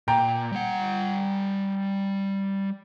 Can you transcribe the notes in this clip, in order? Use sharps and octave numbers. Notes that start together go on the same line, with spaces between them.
A#2 G5 A#5
G3 F#5